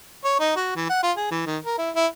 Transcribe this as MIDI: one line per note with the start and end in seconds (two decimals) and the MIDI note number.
0.24 0.39 73
0.40 0.54 63
0.56 0.73 66
0.76 0.86 52
0.90 1.01 78
1.03 1.12 65
1.17 1.30 68
1.31 1.44 52
1.46 1.58 51
1.65 1.78 70
1.79 1.90 64
1.96 2.06 64